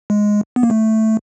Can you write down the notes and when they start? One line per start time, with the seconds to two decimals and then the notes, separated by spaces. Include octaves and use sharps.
0.10 G#3
0.56 B3
0.63 A#3
0.70 A3